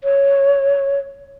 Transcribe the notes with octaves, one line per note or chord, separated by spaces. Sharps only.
C#5